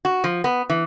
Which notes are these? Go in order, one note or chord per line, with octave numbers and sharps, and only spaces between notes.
F#4
F3
B3
E3